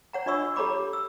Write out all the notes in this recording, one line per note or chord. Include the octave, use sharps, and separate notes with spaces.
C#5 F#5 A#5
D4 F4 D#5 C#6 E6
G4 A4 C#5 A#5 B5 D6
E6